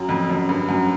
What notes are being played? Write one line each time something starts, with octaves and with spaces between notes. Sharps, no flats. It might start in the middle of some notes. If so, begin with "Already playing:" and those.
Already playing: F#2
F2
F#2
G2
F#2